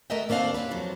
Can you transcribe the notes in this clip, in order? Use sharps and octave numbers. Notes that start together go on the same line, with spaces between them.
A3 B3 A#4 D#5 E5 G5
D#2 A#3 C4 D4 F5 F#5
C4 C#4 D#4 G4 B4
F2 A2 F3 F#3